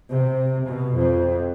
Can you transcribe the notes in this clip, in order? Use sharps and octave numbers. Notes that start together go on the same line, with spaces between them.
C3
B2
F2